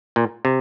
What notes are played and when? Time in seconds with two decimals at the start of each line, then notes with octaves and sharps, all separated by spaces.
0.16 A#2
0.45 C3